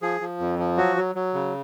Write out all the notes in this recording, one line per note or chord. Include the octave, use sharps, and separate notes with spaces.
F3 G#4
F3
F2
F3
F#3 F#4
F#3
F#3
C#3